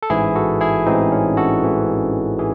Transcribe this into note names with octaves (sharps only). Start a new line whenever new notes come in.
A4
A1 G#2 E3 E4 G#4
F#4 A4
E4 G#4
A1 G#2 E3 C4 D#4
C#4
F#4 A4
A1 G#2 E3
E3 G#4